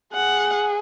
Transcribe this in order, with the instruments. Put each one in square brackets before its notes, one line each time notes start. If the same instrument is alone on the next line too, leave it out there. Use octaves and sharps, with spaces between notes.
[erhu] G#4 [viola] F#5